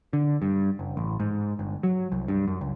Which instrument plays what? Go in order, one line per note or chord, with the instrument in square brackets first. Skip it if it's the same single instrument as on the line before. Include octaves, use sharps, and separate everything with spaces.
[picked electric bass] D3
G2
F#1
A1
G#2
G1
F#3
C2
G2
F#2
C#2